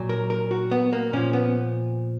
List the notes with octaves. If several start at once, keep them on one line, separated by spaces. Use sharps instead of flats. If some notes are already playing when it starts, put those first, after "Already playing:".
Already playing: A#2 F#3
A#4
A#4
F#4
B3
A#3
A#2 F3 C#4
B3